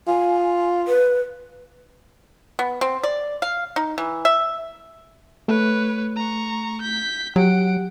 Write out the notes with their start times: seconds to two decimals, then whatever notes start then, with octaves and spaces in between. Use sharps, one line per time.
0.08 F4 G#5
0.88 B4
2.59 B3
2.81 C4
3.03 D5
3.42 F5
3.76 D#4
3.98 E3
4.25 E5
5.48 A3 B4 C#5
6.16 A#5 C#6
6.81 G6 B6
7.36 F#3 G4 F#5 D7